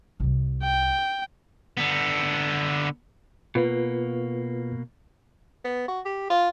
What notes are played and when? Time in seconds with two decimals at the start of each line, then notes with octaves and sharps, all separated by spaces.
0.20 C2 C3
0.63 G5
1.77 D3 B3
3.55 B2 A#3 F4 B4
5.64 B3
5.88 F#4
6.05 G4
6.30 F4